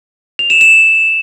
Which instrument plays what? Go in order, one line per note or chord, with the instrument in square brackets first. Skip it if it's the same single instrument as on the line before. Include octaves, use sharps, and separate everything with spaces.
[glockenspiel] F7
E7
E7